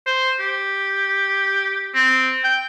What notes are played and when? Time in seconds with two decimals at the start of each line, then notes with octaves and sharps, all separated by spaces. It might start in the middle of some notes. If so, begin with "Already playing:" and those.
0.07 C5
0.40 G4
1.95 C4
2.44 G5